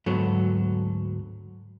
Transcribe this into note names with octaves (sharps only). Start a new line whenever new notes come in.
D2 G#2 F#3 B3 A4